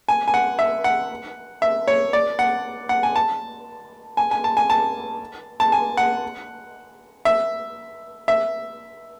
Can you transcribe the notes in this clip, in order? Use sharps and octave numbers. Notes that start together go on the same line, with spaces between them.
G#5
G#5
F#5
E5
F#5
E5
C#5
D5
F#5
F#5
G#5
A5
G#5
G#5
A5
G#5
A5
A5
G#5
F#5
E5
E5